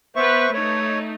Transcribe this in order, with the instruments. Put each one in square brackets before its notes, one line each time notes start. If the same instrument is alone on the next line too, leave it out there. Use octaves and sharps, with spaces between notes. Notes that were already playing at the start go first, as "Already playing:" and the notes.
[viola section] B3 B4 [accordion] C5 E5 C#6
[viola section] A3 D#4 [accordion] C#5